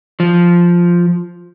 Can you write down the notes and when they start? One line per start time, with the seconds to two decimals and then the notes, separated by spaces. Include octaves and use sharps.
0.20 F3